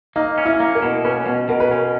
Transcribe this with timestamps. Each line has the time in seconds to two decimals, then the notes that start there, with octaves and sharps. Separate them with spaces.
0.16 A#3 D#4
0.38 C#4
0.45 E4
0.60 A#3
0.75 A#4
0.82 B2
1.05 C#4 B4
1.27 B2
1.49 B2 A#4
1.60 B4
1.71 C#4 A#4